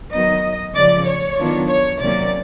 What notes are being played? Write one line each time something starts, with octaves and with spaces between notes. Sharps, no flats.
D#3 F#3 B3 D#4 D#5
C#3 F3 A3 D5
C#5
D#3 F#3 B3 D4 F4
C#5
C3 D#3 F#3 A#3 C#4 D5